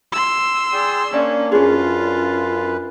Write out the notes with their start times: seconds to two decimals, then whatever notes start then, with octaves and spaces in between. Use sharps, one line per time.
0.13 C6 E6
0.73 G#4 D5 G5
1.13 A#3 C#4 D4 D5
1.52 F#2 C#4 F4 G#4 B4